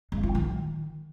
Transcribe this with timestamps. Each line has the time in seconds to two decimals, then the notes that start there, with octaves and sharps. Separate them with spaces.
0.12 G#3
0.23 F4
0.35 D#3